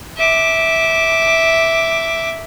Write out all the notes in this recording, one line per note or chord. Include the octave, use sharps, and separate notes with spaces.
E5 D6